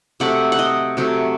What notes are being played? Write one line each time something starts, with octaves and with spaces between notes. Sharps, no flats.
C3 F#3 A3 F#5
F#5
D#5
C3 F#3 A3